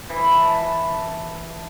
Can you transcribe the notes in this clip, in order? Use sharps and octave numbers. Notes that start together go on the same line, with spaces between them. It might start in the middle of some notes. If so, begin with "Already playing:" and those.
E3
A5